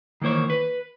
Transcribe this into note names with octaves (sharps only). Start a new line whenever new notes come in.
D#3 E3 A#3 C5 C#5
B4